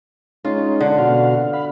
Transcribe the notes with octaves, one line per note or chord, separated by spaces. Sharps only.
G#3 C#4 D#4 F4
D3
B2 F#4 F5
F5 B5